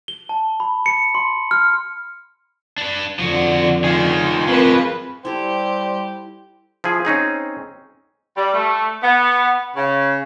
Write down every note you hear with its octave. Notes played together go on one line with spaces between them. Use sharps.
G7
A5
B5
C#7
C6
F6
D4 B4
F2 D3 F3 F#4
D#3 F4 G#4
F3 C4 A#4 B4
G3 E4 G4 A4 C5
F3 E4 G#4
C4 C#4 D#4 G#4
G3
A3
B3
C#3